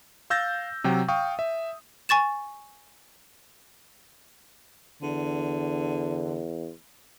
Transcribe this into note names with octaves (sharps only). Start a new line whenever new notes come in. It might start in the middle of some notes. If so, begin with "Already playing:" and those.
F5 E6 G6 A6 A#6
C3 F#3 G5
F5 G5 C#6 D#6
E5
G#5 C#6 A6 E7
E2 D3